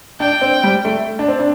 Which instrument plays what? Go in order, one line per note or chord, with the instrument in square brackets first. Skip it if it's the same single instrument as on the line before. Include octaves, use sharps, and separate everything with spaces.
[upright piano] D4 [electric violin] G5
[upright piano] C4
G3
A3
D4
C4
D4